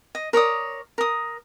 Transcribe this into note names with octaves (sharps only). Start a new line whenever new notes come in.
D#5
A#4 C#5 D5 D#6
A#4 D#6